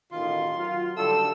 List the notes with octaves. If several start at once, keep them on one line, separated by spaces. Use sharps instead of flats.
A1 B2 D#3 F4 C6
F#3 F4
D3 D#3 G3 A4 E6